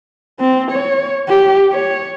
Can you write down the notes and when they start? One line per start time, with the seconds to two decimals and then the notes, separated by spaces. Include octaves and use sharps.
0.40 C4
0.71 C#5
1.29 G4
1.72 C#5